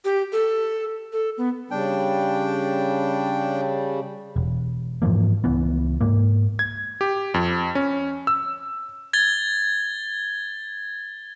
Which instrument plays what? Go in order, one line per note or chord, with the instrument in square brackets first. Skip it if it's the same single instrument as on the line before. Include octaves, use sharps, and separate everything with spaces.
[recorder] G4
A4
A4
B3
[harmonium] C#3 G3 [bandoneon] D4 G5
[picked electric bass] E1
G#2 E3 F3 A#3
C#2 E3 B3
G#2 A#3
[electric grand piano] G#6
G4
F2
C#4
E6
[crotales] G#6 A6 G7